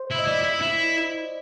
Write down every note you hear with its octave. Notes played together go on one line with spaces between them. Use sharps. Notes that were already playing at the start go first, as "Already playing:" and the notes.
Already playing: C5
E4
D#5
E4 D5
E4
E4